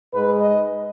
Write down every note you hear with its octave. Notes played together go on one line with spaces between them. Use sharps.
G#2 G#3 B4
D#5